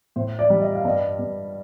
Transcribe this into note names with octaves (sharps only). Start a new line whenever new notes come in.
A2 C5
D5
G3
D#5
F5
G2 D#5
G2